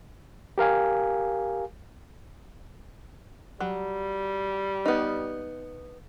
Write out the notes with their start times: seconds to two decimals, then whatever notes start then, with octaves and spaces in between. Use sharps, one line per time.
0.58 G4 A#4 F5 G#5
3.60 F#3 G3
4.85 B3 D#4